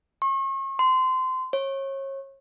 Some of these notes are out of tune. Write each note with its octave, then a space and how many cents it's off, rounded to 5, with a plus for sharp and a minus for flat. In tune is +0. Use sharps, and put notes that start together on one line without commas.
C#6 -40
C6 -20
C#5 -30